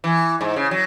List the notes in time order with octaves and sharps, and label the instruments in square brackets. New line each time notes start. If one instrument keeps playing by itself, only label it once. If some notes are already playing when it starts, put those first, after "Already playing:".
[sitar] E3
G#2
C#3
F#3